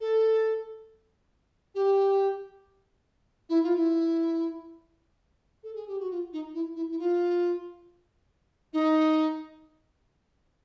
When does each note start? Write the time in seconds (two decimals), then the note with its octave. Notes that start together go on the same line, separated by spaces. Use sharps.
0.01 A4
1.75 G4
3.49 E4
3.63 F4
3.76 E4
5.63 A4
5.75 G#4
5.88 G4
5.99 F#4
6.11 F4
6.33 D#4
6.54 E4
6.76 E4
6.91 E4
6.99 F4
8.73 D#4